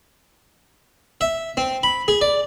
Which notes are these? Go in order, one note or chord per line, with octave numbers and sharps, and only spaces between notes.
E5
C4
B5
G#4
D5